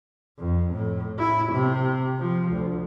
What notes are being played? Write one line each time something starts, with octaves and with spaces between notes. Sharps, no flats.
F2
A2
E4
C3
F3
D2